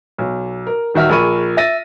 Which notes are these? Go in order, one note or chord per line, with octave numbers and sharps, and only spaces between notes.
B1
A#4
D#1 D#3 F#4 E5 F6
A#1 G#4 A#4 B5 C#6 D#7
E5 A6 A#6 D#7